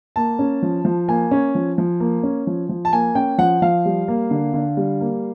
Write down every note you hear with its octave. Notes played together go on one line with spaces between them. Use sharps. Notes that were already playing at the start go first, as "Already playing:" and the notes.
A#3 A5
C#4
F3
F3
A#3 G#5
C#4
F3
F3
A#3
C#4
F3
F3
A5
A#3 G#5
C#4 G5
F3 F#5
F3 F5
G3
A#3
D3
D3
G3
A#3